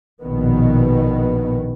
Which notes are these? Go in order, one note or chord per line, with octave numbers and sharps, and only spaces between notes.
A#1 B2 D#3 B3